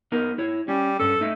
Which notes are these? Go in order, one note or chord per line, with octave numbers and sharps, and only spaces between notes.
B3 D#4 A#4
E4 C#5
G3 C#4
G2 C#4 A4
A3 D#4 E5